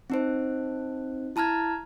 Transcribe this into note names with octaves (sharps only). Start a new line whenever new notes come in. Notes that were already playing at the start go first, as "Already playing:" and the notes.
C4 D#4 C5
E4 A5 A#5 F6 G#6